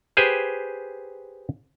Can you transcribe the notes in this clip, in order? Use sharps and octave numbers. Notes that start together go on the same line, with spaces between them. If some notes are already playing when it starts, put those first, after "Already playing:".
G4 G#4 B4 C5 G#5